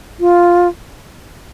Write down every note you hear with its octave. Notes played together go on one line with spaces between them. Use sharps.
F4